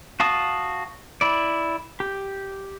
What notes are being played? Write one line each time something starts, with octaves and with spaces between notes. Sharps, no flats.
F#4 F5 A5 D#6
E4 D5
G4